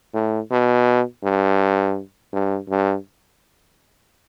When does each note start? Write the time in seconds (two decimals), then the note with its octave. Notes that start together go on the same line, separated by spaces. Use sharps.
0.14 A2
0.51 B2
1.23 G2
2.33 G2
2.69 G2